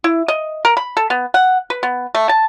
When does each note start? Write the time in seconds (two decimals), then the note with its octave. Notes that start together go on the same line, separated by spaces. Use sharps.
0.04 E4
0.28 D#5
0.65 A#4
0.77 B5
0.97 A4
1.10 B3
1.34 F#5
1.70 B4
1.83 B3
2.15 A3
2.29 A5